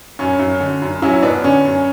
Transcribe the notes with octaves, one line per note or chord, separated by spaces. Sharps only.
F#2 C#4
F#2
D3
F#2
F#3 C#4 E4
F#2 B3 D4
D3 C#4
F#2